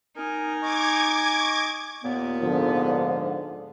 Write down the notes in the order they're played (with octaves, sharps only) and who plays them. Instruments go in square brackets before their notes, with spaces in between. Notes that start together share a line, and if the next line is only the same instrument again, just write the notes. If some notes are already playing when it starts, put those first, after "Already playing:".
[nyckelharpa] D#4 G#5 [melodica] A#4
[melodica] D#5 C#6 [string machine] D6 G#6
[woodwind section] D#2 A#2 B3
[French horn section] G#2 D3 F3